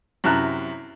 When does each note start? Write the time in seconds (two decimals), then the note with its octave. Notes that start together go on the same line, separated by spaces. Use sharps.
0.24 F#2 C3 E4 A5 A#5 F#6